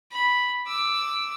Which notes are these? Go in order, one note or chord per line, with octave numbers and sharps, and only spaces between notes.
B5
D6 E6